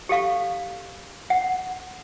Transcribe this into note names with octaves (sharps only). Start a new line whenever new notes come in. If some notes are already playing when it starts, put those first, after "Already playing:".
G4 A4 F5 C#6
F#5